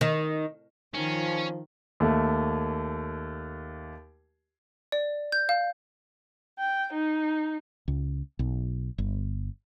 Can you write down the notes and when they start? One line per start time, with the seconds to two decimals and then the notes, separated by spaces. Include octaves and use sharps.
0.01 D#3
0.95 D#3 F3 C#4
2.00 D#2 A3
4.92 D5
5.32 G6
5.49 F5
6.58 G5
6.92 D#4
7.88 C#2
8.39 B1
8.98 G1